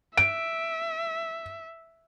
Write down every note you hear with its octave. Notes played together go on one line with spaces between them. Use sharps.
E5 D7